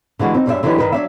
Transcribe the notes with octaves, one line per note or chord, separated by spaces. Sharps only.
D3 E3 G#3 F#4
C4 D#4
F#2 G3 D4 F4 G4 E5
D3 E3 F#3 D#4 G4 B4
G2 D#3 D#4 B4
F#3 D4 E5